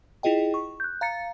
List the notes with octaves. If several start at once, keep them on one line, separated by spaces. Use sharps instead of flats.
E4 F4 G#4 D#5 G5
C#6
F#6 G6
F5 A#5 A6 C#7